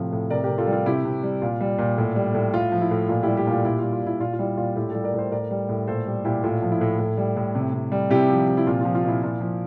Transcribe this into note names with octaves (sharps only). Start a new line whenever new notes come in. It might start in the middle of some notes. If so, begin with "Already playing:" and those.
Already playing: A2 C3 F3
A2
C3 A#4 D5
G4 A#4
C3
F4 A4
G3
F4
C3 E4 G4
C3
G3
A#2 F4
G3
A#2
A2
G3
A2
A2 F4
F3
E4
A2
A#2 F4
G3 E4 G4
E4 G4
A#2 F4 A4
A#2 E4 G4
G3 F4
F4
A#2 E4
A#2 F4
F4
G3 E4
A#2 F4
A2 E4 G4
G3 F4 A4
A#4 D5
A2 A4 C5
A2 A#4 D5
G3
A2
A#2 A4 C5
G3
A#2 E4 G4
A2 F4
F3
E4
A2
A2
G3
A2
C3
C3
G3
C3 E4 G4
F3
C3
E4
A#2 F4
F3 F4
F4
A#2 E4
A#2
F3